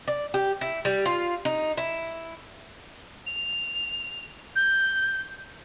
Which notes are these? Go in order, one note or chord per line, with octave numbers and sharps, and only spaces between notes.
D5
G4
E4
G3
F4
D#4
E4
F7
G6